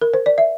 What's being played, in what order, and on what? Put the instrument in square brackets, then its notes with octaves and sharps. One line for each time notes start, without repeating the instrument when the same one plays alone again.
[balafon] A#4
C5
D5
E5